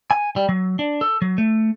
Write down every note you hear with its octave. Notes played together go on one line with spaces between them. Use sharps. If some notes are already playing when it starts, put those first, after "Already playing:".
G#5
G3
F#3
D4
A4
F#3
A3